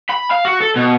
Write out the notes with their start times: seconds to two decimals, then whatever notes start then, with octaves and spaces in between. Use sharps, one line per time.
0.10 B5
0.31 F5
0.45 F#4
0.60 A4
0.76 B2